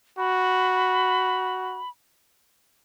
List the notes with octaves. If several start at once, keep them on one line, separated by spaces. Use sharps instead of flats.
F#4 B5